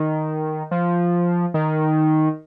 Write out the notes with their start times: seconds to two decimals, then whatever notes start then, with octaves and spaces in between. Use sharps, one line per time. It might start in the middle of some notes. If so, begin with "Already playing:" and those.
Already playing: D#3
0.71 F3
1.54 D#3